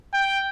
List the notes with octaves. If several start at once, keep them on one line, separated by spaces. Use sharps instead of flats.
G5